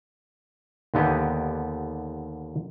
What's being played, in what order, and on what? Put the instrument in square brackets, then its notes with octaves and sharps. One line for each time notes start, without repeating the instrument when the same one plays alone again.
[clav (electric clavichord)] D#2 D3 B3 G4 D#5 G#5